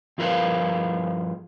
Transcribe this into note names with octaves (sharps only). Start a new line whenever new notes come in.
G2 F3 F4 A#4 B4 F5